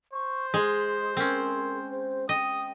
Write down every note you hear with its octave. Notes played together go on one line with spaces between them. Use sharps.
C5 C#6
G#3 G#4
C4 C#4 A#4
C5
D#5 G5 D#6